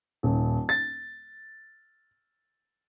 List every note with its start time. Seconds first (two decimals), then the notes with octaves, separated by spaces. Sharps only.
0.23 D#1
0.69 A6